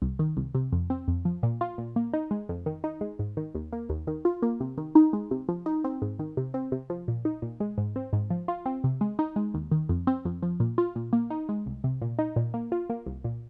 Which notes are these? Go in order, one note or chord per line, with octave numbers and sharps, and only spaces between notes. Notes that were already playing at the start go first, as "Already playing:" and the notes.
C2
D#3
C2
C3
F2
C4
F2
F3
A#2
F4
A#2
A#3
D#4
G#3
F2
D#3
D#4
G#3
G#2
D#3
D#2
A#3
D#2
D#3
F4
A#3
C3
D#3
D#4
G#3
C3
F3
D#4
C4
G#2
D#3
C3
C4
C3
F3
A#2
D#4
A#2
G#3
G#2
C4
G#2
F3
F4
C4
C3
G#3
D#4
G#3
D#2
D#3
F2
C4
F2
F3
A#2
F4
A#2
A#3
D#4
G#3
C2
C3
A#2
D#4
A#2
A#3
F4
A#3
C2
A#2